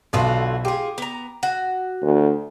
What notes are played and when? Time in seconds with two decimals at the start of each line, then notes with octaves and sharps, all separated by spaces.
0.13 B1 D3 F4 F#4
0.65 F4 G4 G#4
0.98 B3 A#5
1.43 F#4
2.02 D2